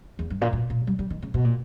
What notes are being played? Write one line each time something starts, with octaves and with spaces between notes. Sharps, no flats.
E2
G2
A#2
A#2
A#2
G3
G3
D#3
C#3
B2
A#2